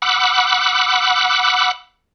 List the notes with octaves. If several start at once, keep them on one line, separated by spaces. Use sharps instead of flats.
F#5 B5 D6 E6 F#6